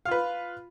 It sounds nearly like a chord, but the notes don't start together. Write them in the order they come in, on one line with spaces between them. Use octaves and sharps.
F5 F4 B4